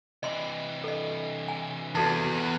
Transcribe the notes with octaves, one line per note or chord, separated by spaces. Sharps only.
C3 E3 D#5 C6
A4 D#5
G#5
E2 F#4 A4 A5
C3 B4